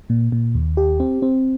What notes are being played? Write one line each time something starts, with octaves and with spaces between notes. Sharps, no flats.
A#2
A#2
D#2
G4
C4
C4